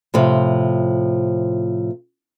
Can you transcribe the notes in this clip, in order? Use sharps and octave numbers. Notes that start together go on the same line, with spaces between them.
A2 C3 F3